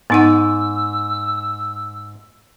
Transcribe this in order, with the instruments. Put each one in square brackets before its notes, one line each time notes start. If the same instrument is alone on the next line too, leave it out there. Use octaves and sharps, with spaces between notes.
[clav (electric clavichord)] G#2 [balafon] B3 D#4 F#5 [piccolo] E6